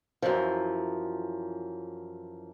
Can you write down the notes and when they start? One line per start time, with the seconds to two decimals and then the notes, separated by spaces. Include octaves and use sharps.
0.22 F#2 E3 F3